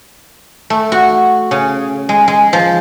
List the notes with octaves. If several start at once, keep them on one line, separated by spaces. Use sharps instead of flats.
A3
F#4
C#3
G#3
G#3
F3